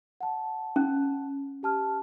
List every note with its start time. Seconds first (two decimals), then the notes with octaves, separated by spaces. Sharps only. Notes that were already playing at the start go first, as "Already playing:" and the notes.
0.21 F#5 A5
0.76 C#4
1.63 G4 A5 F6